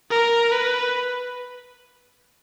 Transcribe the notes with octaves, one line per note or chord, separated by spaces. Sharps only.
A#4
B4